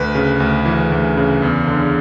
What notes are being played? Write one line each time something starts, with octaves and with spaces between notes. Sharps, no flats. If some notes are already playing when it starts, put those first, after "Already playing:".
Already playing: D2 B4
C#3
D2
E3
D2
C#3
E2
D3